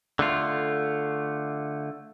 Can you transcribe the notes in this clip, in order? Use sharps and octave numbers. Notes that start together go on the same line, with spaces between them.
D3 A3 F4